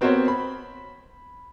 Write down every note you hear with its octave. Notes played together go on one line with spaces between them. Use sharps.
B3 C4 F#4 A#4 C5 C#5
B5